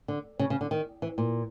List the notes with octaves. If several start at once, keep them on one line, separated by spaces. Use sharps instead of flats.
D3
C#3
C#3
D3
D#3
E3
A#2